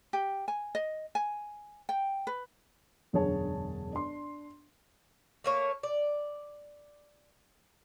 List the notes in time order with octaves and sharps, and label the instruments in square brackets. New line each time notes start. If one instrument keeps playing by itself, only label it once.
[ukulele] G4
G#5
D#5
G#5
G5
B4
[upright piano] E1 F#2 D3 G#4 C#5 A5
D4 C6
[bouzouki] A3 A#3 C#5
D5